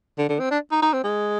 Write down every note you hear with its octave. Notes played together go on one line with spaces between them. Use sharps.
D3
D3
C4
D4
D#4
D#4
C4
G#3